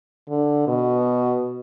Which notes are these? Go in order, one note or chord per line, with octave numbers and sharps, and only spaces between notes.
D3
B2